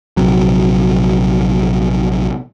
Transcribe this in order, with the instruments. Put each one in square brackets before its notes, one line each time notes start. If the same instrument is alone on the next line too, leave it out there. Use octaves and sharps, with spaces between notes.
[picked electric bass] A#1 C3 F#3